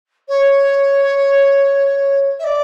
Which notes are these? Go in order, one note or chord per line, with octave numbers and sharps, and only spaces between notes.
C#5
E5
D5